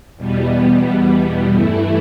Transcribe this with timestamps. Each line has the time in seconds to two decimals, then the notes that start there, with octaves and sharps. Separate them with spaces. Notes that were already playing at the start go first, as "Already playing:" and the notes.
0.16 E2 B2 G3 B3
1.53 G2 E3 A3 E4